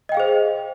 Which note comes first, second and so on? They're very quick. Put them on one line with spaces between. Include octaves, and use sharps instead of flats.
D#5 G5 F5 G#4 C5